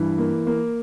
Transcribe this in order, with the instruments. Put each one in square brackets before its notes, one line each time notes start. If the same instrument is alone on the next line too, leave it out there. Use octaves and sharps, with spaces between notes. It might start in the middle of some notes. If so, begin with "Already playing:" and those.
Already playing: [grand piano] G2 E3
A#3
A#3